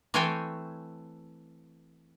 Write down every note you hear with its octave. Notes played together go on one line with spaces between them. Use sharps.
E3 A3 C4 C#5 G5 G#5